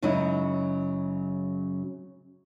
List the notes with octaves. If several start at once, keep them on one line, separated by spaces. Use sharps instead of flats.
F#2 C#3 F#3 G#3 D#4 E4